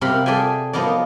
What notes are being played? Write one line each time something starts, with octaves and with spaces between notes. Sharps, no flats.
C3 F4 G4 A#4 F5 B5
G#4 A4 D5 E5 G5 G#5
F3 F#3 B3 D#4 A#4 D5